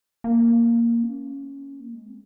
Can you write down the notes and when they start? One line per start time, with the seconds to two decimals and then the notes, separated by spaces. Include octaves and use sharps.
0.24 A#3
1.03 C#4
1.80 A#3
1.94 G#3
2.06 C4